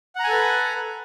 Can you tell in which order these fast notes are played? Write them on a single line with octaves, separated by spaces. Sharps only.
F#5 A#5 G#5 A4 B4